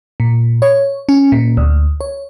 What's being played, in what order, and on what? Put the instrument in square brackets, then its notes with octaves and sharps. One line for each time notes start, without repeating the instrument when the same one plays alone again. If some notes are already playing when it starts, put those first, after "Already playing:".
[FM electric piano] A#2
C#5
C#4
A#2
D2
C#5